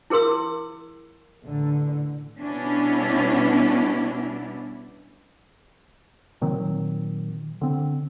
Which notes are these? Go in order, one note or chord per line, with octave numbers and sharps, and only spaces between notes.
E4 G#4 A#4 C6 E6
A1 D3
B2 G3 B3 C#4 D4 E4
A#2 D#3 F#3 C4
D3 C4